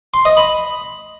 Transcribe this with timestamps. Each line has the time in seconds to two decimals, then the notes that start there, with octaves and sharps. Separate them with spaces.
0.14 C6
0.25 D#5
0.37 B5